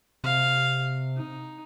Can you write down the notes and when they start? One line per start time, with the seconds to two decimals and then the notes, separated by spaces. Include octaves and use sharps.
0.24 C3 F5
1.16 D#4